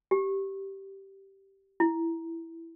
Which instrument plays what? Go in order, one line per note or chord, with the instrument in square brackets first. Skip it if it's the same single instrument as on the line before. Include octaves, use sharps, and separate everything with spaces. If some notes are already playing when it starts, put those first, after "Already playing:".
[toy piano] G4
E4